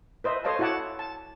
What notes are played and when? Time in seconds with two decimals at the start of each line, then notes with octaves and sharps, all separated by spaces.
0.24 B4 C5 D#5 E5
0.44 A4 C5 C#5 D#5 F5 A5
0.59 E4 F#4 C#5 F#5 A5 D6
0.99 A5